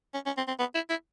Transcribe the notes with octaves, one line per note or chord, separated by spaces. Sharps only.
C#4
C#4
C4
C4
B3
E4
E4